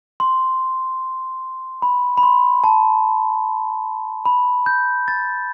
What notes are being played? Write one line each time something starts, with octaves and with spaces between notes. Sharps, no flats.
C6
B5
B5
C6
A5
B5
G6
A6